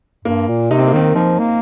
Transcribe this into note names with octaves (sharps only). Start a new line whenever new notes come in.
G2 A#3
A#2
C3 D#4
C4
A#3
D#3 C4
F3 D#4
A#3